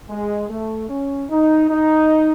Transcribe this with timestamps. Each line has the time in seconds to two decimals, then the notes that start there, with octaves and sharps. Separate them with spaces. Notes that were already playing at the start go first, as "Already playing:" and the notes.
0.09 G#3
0.49 A3
0.89 C#4
1.30 D#4
1.69 D#4